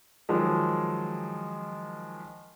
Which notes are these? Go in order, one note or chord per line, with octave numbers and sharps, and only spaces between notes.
D#3 F3 F#3 G#3